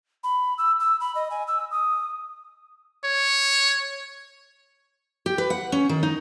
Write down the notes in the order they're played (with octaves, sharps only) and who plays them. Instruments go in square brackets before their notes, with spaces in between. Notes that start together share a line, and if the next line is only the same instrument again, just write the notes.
[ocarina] B5
E6
E6
B5
D#5
G#5
E6
D#6
[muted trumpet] C#5
[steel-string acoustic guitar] G4
B4
F#5
C#4
D#3
D#4